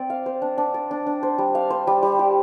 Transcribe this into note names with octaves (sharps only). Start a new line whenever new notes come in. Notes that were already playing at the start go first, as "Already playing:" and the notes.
Already playing: C4 D5
F5
C5
D4
D4
D5
D4
D4
C5
G3
F5
C5
G3
G3
G4